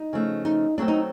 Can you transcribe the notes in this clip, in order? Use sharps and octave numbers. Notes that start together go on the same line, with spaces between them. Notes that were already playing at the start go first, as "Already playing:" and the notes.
Already playing: D#4
C#3 F3 A3
D#4
B2 F#3 A3 C4 D4
D#4